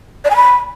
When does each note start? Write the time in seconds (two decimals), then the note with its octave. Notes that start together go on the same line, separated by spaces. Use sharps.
0.25 D5
0.30 G#5
0.36 B5